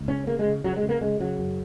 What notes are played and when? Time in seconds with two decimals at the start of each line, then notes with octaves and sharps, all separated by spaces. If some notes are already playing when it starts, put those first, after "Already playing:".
Already playing: C#2
0.08 C#3 C#4
0.27 C#3 A#3
0.39 G#3
0.45 C#3
0.64 C#3 F#3
0.76 G#3
0.83 C#3
0.89 A#3
1.01 C#3 G#3
1.20 C#3 F#3
1.39 F#2